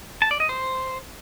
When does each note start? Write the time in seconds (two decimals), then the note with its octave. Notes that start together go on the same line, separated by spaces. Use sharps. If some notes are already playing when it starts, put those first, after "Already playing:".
0.22 A5
0.31 D5
0.40 D#5
0.49 C5